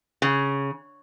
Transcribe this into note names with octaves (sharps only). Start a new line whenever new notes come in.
C#3